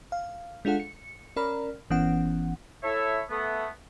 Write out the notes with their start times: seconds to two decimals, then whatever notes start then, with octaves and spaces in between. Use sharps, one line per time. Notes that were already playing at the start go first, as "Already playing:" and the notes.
0.12 F5
0.65 G#3 D4 F4 A4 F#5
0.80 C#7
1.36 C#4 A#4 D5 A#5 B5 F6
1.90 G1 E3 B3 C#4 F#5
2.83 E4 A4 C#5 E5
3.30 A3 B3